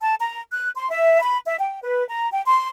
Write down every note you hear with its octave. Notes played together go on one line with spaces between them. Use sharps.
A5
A#5
F#6
C6
E5
B5
E5
G5
B4
A#5
G5
C6